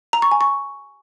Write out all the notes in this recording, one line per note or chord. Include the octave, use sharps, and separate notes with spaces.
A#5
C#6
G#5
C#6